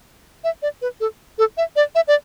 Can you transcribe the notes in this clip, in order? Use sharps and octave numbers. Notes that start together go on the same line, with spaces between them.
E5
D5
B4
A4
A4
E5
D5
E5
D5